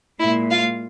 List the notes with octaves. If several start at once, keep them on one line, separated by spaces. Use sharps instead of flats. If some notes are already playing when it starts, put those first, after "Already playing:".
A#2 G#3 E4 E5
F4 F5